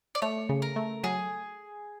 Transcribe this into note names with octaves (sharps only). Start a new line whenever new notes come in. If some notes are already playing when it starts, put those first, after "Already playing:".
D5
A3 C#5
C#3
A#4
A3
F#3 G#4